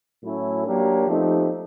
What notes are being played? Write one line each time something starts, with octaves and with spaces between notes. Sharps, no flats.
A2 F#3 A3 C#4 E4
F#3 A#3 D4 G4 A#4
F3 A3 C4 D#4 G4